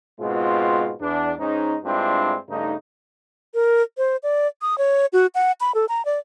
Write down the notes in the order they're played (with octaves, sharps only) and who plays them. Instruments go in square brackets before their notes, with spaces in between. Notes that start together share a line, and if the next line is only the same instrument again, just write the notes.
[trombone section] G#2 B2 G#3 C4 F4
E2 D4
G#2 G#3 C#4 D#4
G2 G#3 C4 D4 E4 F4
G2 C#3 A3 D#4
[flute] A#4
C5
D5
D#6
C#5
F#4
F#5
B5
A4
A#5
D5